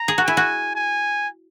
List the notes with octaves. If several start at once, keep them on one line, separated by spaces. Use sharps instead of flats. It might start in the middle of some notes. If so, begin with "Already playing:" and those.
Already playing: A#5
G#4
F#4
E4 G#5
F#4
G#5